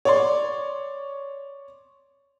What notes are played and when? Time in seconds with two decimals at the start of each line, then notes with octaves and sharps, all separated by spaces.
0.05 C#5 D5 C6